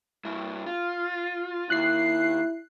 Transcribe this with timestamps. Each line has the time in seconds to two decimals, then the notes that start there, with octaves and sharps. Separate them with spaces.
0.25 G2 E4
0.66 F4
1.70 D#2 E4 F#6 C7